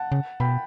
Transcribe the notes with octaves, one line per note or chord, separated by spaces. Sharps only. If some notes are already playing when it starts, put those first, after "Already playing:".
Already playing: F#5 A5
C#3
B2 G5 B5